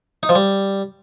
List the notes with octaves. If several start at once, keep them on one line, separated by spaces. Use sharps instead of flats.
D#4
F3
G3